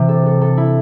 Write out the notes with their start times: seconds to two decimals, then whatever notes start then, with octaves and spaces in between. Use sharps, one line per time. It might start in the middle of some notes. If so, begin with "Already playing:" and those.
Already playing: C3 E3
0.09 A4
0.26 A4
0.41 A4
0.57 E4